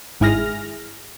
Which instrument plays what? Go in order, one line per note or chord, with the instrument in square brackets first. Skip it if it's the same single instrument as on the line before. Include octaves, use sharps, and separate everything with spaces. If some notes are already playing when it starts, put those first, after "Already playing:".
[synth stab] G#1 G#2 E4 G#4 F6 A#6